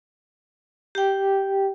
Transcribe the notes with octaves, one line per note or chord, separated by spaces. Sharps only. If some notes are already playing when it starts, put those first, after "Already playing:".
G4 G5